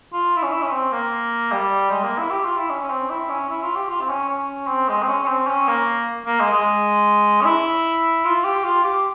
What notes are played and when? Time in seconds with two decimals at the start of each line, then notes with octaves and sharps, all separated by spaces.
0.12 F4
0.36 E4
0.42 C#4
0.52 E4
0.62 C#4
0.72 C4
0.92 A#3
1.52 G3
1.90 G#3
2.04 A#3
2.18 E4
2.30 G4
2.44 F4
2.57 E4
2.70 C#4
2.81 C#4
2.90 C4
3.10 E4
3.29 C#4
3.50 E4
3.62 F4
3.76 G4
3.88 F4
4.01 C4
4.09 C#4
4.28 C#4
4.67 C4
4.88 G#3
5.02 C4
5.08 C#4
5.23 C#4
5.28 C4
5.47 C#4
5.68 A#3
6.26 A#3
6.40 G#3
6.52 G#3
7.41 C#4
7.45 E4
8.25 F4
8.44 G4
8.64 F4
8.84 G4